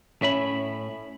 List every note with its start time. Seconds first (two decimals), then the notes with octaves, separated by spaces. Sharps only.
0.22 A2 C#4 E5 B5